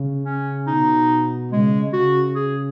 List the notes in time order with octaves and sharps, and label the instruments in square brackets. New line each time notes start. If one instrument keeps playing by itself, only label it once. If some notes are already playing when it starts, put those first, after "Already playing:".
Already playing: [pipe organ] C#3
[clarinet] C#4
[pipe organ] B2 [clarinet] D#4
[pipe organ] C#3 [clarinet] G#3
[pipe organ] C#3 [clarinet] F#4
[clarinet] G#4